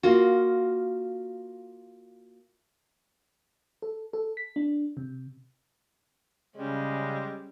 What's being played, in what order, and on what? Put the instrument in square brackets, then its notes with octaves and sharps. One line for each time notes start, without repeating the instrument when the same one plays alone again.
[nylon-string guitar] A#3 F4 F#4
[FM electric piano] A4
A4
B6
D4
C3
[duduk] C#3 [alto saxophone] G3 [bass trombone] G#3 [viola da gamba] C#4